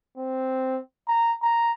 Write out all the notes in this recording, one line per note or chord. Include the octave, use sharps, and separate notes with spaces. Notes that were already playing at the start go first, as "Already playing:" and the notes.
C4
A#5
A#5